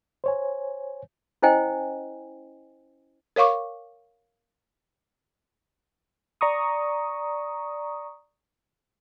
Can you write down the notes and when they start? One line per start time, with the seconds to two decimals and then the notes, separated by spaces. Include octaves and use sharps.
0.24 C5 C#5 G#5
1.42 C#4 E4 C5 D#5 G5 G#5
3.36 A#4 C#5 F5 C#6 D6
6.41 D5 A#5 C#6 D#6